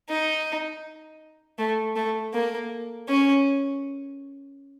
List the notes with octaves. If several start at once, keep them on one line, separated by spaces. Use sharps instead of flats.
D#4
A3
A3
A#3
C#4